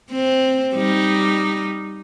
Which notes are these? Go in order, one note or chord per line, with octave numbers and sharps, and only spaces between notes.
C4
G3 D#4